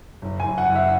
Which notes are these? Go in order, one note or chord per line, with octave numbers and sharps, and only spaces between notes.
F#1
G#5
F#1
F#5
F#1
E5